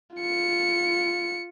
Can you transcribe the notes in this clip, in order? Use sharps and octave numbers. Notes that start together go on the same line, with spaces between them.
F4 C#7